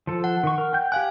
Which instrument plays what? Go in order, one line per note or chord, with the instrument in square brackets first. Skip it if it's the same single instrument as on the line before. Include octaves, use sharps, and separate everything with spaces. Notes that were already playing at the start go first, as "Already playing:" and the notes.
[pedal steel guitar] F3 A4
[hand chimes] F#5
[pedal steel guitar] D#3 C#6
A#4
G5 G6
[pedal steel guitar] G4 G5 F#6 [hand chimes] F5 G#5